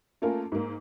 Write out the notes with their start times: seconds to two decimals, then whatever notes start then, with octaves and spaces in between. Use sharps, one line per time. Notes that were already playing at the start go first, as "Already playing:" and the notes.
0.22 A3 A#3 C#4 F4 A4 A#4
0.52 G#2 A#3